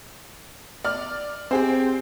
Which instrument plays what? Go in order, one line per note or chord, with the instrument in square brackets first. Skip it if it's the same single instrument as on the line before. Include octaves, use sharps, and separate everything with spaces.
[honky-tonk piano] D5 F6
[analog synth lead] C4 [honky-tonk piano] G4 G#4 C5